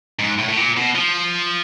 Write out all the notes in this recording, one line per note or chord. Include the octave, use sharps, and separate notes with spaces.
G#2
A2
A2
A#2
B2
F3